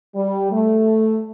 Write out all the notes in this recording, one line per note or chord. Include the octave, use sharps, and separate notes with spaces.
G3
A3